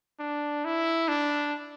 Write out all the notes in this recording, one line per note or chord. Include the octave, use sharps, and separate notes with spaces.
D4
E4
D4